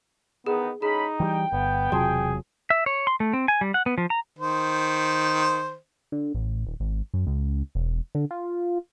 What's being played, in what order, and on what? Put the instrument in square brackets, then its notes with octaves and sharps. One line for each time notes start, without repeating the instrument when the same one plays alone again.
[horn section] D#3 E3 D#4 [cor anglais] B3 [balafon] G#4
[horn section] A2 C#4 B5 [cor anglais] D#4 [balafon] G#4
[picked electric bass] E3 G3 [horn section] G5
[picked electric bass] G1 [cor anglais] B3
[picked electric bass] E1 C3 F#3 [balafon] F4 A5 C6 [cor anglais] G#4
[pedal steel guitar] E5
C#5
C6
A3
C4
G#5
G3
F#5
B3
F3
A#5
[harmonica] D#3 C5
[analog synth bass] D3
A1
D#1
G#1
F#2
C#2
E1
D3
F4